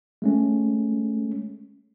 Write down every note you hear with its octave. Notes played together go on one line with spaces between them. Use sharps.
G#3 A3 C#4